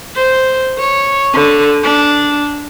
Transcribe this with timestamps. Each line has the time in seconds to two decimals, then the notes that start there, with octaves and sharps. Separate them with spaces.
0.16 C5
0.78 C#5
1.33 D3
1.83 D4